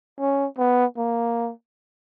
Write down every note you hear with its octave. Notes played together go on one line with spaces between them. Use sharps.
C#4
B3
A#3